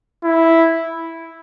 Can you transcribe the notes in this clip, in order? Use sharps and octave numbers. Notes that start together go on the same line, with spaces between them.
E4